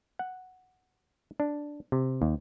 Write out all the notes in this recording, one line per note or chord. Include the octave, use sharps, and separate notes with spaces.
F#5
D4
C3
D#2